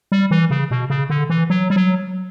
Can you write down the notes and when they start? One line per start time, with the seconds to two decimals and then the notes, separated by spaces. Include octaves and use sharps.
0.12 G3
0.31 E3
0.50 C#3
0.71 B2
0.90 C#3
1.10 D3
1.30 E3
1.50 F#3
1.70 G3
1.76 F#3